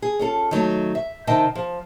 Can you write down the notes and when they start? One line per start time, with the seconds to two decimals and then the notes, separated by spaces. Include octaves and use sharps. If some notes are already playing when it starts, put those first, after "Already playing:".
0.02 G#4
0.19 C#4 F4 A4
0.51 D#3 F#3 A3
0.95 E5
1.27 C3 D#3 D#5 G5 A5
1.55 F3